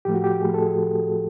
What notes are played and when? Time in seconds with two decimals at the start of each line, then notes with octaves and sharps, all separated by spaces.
0.05 A2 F3 A3 G4
0.14 F#4
0.24 G4
0.41 A2 F3 A3 G#4
0.54 A4